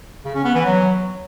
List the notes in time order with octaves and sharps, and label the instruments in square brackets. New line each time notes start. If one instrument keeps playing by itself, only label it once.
[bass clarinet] C#3
C#4
B3
E3
F#3